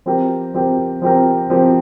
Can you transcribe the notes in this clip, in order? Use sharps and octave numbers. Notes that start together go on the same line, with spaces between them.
F3 C4 G4 A#4
F3 C4 G4 A#4
F3 C4 G4 A#4
F3 C4 G4 A#4